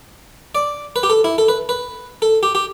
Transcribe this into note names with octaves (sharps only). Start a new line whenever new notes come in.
D5
B4
G4
A4
E4
A4
B4
B4
A4
G4
G4